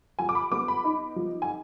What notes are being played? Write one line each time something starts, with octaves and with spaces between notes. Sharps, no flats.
F3 G#5
D6
B5
B3 D6
B5
D#4
F3
G#5